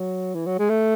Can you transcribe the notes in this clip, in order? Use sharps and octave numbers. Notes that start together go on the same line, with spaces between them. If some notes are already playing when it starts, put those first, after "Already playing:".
Already playing: F#3
E3
F#3
G#3
A3